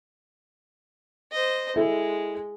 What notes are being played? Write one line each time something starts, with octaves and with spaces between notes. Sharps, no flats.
C5 D#5
G#3 E4 A4 E5